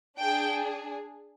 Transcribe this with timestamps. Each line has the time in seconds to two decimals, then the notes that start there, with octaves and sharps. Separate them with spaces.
0.18 D4 G#4 G5